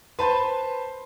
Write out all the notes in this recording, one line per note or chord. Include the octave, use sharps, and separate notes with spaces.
B4 C5 A5 C6